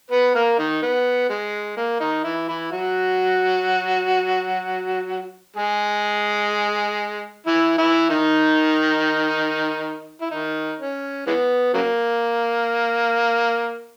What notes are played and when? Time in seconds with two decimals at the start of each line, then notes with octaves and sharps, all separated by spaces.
0.11 B3 B4
0.35 A#3 A#4
0.58 D#3 D#4
0.82 B3
1.29 G#3
1.77 A#3
2.00 D#3 D#4
2.24 E3 E4
2.48 E3 E4
2.72 F#3 F#4
5.56 G#3 G#4
7.46 E3 E4
7.78 E3 E4
8.09 D#3 D#4
10.21 E4
10.31 D#3 D#4
10.79 C#4
11.27 E3 G#3 B3
11.74 C#3 F#3 A#3